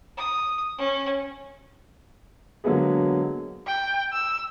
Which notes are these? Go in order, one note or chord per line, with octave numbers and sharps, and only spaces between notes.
D#6
C#4
D3 F#3 G#3 A#3 B3 G#4
G5
E6